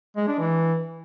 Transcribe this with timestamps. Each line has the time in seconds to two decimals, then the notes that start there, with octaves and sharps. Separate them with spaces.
0.16 G#3
0.28 D4
0.39 E3